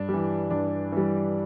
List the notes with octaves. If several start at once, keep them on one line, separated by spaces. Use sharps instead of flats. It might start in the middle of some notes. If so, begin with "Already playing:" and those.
Already playing: G2 D4
E3 G3
G2 D4
E3 G3